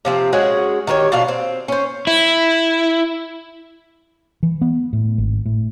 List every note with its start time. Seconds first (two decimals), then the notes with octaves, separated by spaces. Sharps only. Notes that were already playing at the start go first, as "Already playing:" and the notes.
0.05 C3 F3 C4
0.33 G#3 C#4 F#4 G#4
0.87 D#3 G4 B4 C#5
1.12 B2 D4 F4 F5
1.28 C4
1.68 C#4 C5
2.07 E4
4.43 E3
4.61 B3
4.93 A2
5.18 G#1
5.46 A2